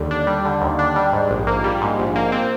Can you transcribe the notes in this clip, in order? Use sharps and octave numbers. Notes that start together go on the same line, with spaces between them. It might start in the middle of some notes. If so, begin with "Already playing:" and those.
Already playing: D#2 D3 G3
D4
G3
D3
D#2
D4
G3
G#2
A#1
A#3
G3
G#2
A#1
A#3
C4